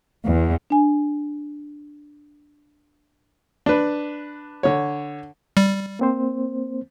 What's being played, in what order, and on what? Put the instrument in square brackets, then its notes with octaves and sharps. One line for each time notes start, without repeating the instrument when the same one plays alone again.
[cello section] E2
[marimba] D4 G#5
[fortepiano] D4 B4
D3 C#5
[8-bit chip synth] G3
[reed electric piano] A#3 C4 C5